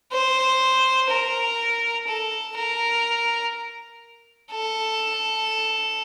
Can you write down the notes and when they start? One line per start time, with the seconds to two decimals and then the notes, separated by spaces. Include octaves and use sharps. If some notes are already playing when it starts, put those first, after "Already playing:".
0.12 C5
1.10 A#4
2.08 A4
2.57 A#4
4.52 A4